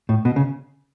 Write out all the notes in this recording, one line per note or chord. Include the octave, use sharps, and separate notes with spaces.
A2
B2
C#3